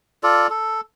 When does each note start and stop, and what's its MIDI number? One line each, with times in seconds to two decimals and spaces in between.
0.23 0.47 65
0.23 0.47 69
0.23 0.47 74
0.50 0.81 69